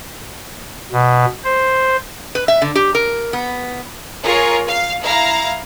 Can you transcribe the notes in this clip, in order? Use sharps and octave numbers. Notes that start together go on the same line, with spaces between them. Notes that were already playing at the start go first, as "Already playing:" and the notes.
B2
C5
B4
E5
D3
G4
A#4
B3
F4 G#4 A#4 C#5
F5
E4 F5 A#5